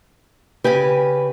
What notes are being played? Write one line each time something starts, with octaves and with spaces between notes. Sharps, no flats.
C#3 G4 B4 G#5